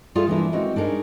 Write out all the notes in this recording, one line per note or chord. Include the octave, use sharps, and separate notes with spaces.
G3 A3 F4 G#4 A4 F5
E3 A#3 D4 E4
G#3 A#3 C4 C#4 F#4
D4 D#4 G#4 A#4 D#5